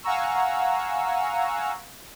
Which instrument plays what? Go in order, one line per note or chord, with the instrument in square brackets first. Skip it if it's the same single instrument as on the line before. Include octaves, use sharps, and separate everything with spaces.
[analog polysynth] F5 F#5 G#5 A#5 C#6 E6